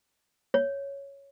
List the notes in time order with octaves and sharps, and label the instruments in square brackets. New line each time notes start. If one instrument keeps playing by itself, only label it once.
[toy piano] C#5